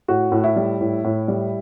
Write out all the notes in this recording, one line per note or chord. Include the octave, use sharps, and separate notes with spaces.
A2 F#4
A2
E4
G3
A2
A2
G3